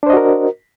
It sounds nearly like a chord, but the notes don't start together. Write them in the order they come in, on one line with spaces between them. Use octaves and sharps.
D4 C5 D#5 F#4 A#4